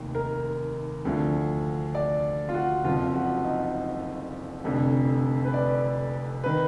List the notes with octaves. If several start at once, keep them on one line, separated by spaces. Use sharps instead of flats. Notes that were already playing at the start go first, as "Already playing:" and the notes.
Already playing: F1 D#2 D#3
A#4
D2 D3 F3
D5
F4
F#4
F#1 F2 F3 F4
F#4
D#4
F1 F2 D3
B4
D5
D#3 B4